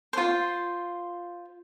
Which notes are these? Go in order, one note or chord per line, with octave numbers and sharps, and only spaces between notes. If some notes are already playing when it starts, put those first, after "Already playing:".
F4 C5